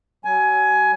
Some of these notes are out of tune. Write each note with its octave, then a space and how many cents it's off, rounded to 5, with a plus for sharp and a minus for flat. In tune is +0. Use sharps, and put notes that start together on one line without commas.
F#3 +35 G#5 +20